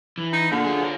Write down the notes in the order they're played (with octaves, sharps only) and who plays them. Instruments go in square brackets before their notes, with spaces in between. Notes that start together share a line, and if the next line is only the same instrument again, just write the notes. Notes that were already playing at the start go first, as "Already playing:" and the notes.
[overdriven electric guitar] E3
[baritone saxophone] D#4
[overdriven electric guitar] A#2 A#3 [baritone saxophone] D3
[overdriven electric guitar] F4 G#4
F4 C#5